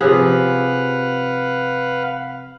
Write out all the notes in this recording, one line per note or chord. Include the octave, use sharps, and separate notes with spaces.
C3 F3 G#4 B4 F5 F#5